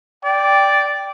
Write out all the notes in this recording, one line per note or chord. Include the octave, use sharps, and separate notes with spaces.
D5 G5